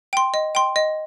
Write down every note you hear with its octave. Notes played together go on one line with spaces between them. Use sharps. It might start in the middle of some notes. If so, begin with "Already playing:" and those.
G5 C6
D#5
G5 C6
D#5